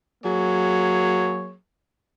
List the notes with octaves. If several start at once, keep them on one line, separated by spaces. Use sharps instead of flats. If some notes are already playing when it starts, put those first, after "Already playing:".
F#3 A#3 G#4 C#5